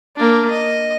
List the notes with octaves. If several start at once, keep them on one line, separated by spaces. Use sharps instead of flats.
A#3 D4
D#5